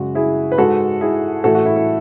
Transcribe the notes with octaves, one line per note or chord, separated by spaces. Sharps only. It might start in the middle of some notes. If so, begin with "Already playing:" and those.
Already playing: F#2 C#3 G#3 F#4
E4 G#4
B4
G#2 G#3 F#4 A4
E4 G#4
A2 E3 A3 F#4 A4
F#4
E4
E4